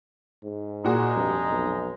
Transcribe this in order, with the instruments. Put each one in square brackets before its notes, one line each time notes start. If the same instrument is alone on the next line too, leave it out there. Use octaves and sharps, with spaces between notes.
[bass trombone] G#2
[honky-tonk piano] A#2 F#4 G#4 [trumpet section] G#3 D#4 A#5
[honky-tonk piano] F1 [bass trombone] G2
[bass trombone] B1